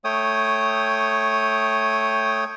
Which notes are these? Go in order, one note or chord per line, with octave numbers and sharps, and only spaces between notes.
A3 C#5 G5 D#6